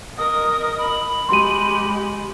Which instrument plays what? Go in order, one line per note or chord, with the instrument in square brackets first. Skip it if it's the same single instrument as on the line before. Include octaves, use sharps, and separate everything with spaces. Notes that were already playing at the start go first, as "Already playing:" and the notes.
[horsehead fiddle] A#4 D#5 [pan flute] D#6
[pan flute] B5
[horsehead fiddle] G#3 G4 [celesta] C6 D#7